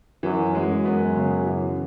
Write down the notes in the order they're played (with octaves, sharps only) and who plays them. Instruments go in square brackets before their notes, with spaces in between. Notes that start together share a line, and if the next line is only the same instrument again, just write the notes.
[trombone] F#2 [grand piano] E3
[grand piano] G#3
[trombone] F#2
[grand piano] B3
C#3
E3